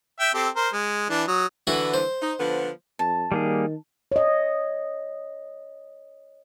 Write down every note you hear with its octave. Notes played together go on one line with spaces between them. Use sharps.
E5 G5
C4 G4 A4
A#4 C5
G#3
E3 D4
F#3 D#6
D3 E3 E4 F#4 B4
C5
D#4
D3 F3 B3
F2 A5
D#3 G3 A#3 G#4
C#5 D#5